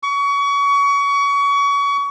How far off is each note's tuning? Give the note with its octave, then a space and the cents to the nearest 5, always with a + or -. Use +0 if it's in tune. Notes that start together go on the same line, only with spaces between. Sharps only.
C#6 +30